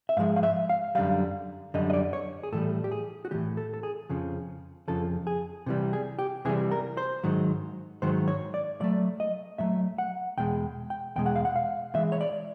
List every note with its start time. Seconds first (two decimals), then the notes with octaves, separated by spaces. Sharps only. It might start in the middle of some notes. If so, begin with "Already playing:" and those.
0.09 E5
0.17 G#2 F3 G#3 F5
0.36 F5
0.43 E5
0.69 F5
0.95 F#2 D3 G3 F5
1.74 F#2 D3 G3 D#5
1.90 D#5
1.93 D5
2.13 C#5
2.43 G#4
2.52 A2 E3 G3 A4
2.84 G4
2.91 G#4
3.25 F#4
3.31 A2 E3 G3 G4
3.57 A4
3.74 A4
3.83 G#4
4.09 F2 C#3 F3
4.88 F2 C#3 F3 A4
5.27 G#4
5.66 C3 E3 G3
5.93 G#4
6.19 G4
6.45 C3 E3 G3 G#4
6.71 A#4
6.97 C5
7.24 G#2 D#3 F#3
8.02 G#2 D#3 F#3 C5
8.28 C#5
8.54 D5
8.80 A2 F#3 A3 D5
9.20 D#5
9.58 A2 F#3 A3 E5
9.98 F#5
10.37 E2 B2 G#3 G5
10.90 G5
11.16 E2 B2 G#3 G5
11.26 F#5
11.36 F5
11.45 F#5
11.56 F5
11.94 A2 E3 G#3 E5
12.12 C#5
12.21 D5